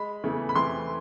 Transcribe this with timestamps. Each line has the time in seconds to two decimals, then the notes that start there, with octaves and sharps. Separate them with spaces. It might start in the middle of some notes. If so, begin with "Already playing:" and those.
Already playing: G#3 B5
0.24 E2 C#3 E3 A3
0.49 B5
0.55 C3 E3 A3 C6